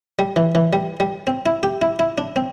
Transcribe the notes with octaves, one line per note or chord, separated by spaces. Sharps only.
G3
E3
E3
G3
G3
C4
E4
G4
E4
E4
D4
C4